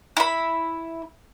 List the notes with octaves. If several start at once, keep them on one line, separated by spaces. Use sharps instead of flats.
E4 B5